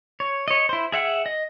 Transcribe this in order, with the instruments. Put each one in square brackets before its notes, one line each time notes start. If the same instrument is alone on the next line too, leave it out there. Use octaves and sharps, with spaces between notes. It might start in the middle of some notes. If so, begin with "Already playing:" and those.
[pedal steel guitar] C#5
C#5 D#5
E4 C5
G#4 E5 F#5 G5
D#5